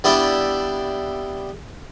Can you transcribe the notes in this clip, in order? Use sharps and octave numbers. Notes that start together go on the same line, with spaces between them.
G3 B3 D4 E4 G4